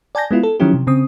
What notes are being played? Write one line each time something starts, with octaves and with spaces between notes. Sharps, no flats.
D5 G#5 A5 G6 A#6
G#3 B3 E4 F4
A4
D#3 F3 F#3 C#4 E4 G4
C3
C#3 C4 D#6